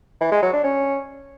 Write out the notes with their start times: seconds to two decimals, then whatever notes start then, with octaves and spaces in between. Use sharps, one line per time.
0.21 E3
0.32 G#3
0.42 F#3
0.53 D4
0.64 C#4